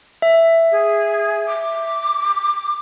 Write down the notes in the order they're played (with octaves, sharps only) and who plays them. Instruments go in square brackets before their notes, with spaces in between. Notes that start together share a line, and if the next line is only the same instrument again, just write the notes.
[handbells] E5
[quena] G#4
D6